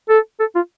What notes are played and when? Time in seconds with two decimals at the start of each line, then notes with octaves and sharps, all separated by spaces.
0.10 A4
0.40 A4
0.55 F4